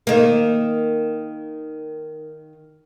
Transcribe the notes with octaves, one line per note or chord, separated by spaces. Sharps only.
D#3 A#3